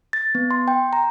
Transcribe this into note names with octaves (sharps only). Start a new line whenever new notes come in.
A6
B3
C6
G5
A#5